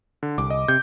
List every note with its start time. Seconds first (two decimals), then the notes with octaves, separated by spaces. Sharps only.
0.23 D3
0.38 C2 D6
0.50 D#5
0.68 C3 G6